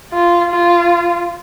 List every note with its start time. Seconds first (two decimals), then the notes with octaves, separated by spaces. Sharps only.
0.14 F4
0.51 F4